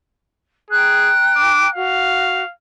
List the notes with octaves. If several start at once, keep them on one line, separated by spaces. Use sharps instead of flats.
G#4 G5 A#5 F#6
D6
F#4 F5